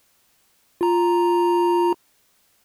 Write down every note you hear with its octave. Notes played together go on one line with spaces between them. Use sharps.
F4 A#5